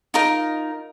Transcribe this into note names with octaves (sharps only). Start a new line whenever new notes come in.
D#4 F4 A#4 A#5